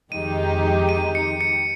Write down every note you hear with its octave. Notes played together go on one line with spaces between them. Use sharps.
F2 D#3 G#3 D#4 G4 D#7
D#7
C#7
C#7